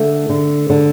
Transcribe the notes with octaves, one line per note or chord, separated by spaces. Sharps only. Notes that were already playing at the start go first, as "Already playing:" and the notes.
Already playing: D3 A3
D3
D3